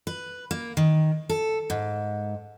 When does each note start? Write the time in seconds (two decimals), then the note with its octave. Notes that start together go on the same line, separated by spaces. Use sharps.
0.07 B4
0.51 A#3
0.77 D#3
1.29 A4
1.70 G#2